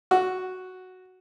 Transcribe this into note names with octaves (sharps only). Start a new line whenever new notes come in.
F#4